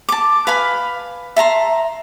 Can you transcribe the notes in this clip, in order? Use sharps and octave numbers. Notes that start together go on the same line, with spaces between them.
A5 D6
B4 F5 G#5 B5
E5 A5 A#5 C6